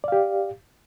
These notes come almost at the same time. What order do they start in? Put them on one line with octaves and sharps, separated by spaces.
D5 F5 G4